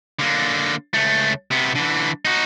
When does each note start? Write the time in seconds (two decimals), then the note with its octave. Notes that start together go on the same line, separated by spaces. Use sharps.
0.19 D3 A#3
0.94 C#2 A3
1.51 C3 B3
1.75 D3 E3
2.25 D#4 F#4